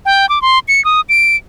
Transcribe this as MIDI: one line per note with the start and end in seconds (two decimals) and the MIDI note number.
0.05 0.29 79
0.29 0.42 86
0.42 0.59 84
0.68 0.83 97
0.85 1.01 87
1.09 1.36 98